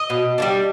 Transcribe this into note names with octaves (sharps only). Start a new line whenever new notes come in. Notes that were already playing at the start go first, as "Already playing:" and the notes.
Already playing: D#5
B2
G3 A#3 D4